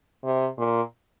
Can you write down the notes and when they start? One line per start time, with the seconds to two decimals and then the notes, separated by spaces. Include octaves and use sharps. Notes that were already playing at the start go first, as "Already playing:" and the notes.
0.25 C3
0.58 A#2